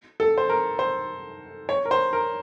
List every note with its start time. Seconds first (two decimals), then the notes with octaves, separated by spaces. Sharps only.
0.20 A4
0.38 C5
0.49 A#4
0.79 C5
1.69 C#5
1.85 A#4
1.91 C5
2.13 A#4